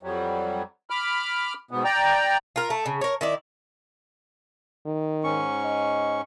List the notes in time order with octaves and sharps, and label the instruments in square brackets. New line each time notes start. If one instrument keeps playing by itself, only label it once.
[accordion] F2 F#3 G3
B5 D6 F6
G#2 B2 B3
D5 G5 A#5
[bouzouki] F4 A#4
A3
C#3
A#4 C#5
D#3 E4 D5
[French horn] D#3
[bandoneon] G#2 C#4 C#6
[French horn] D#5